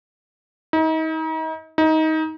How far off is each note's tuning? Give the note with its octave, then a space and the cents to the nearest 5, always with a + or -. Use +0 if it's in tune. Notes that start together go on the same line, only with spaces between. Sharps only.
D#4 +35
D#4 +20